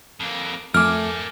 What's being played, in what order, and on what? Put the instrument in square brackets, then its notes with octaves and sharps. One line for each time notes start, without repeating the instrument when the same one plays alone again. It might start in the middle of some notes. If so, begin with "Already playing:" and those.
[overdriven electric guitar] F2 A#3
[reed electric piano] F2 D6 [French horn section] A3 [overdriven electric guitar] A#4 G#5 [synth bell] F6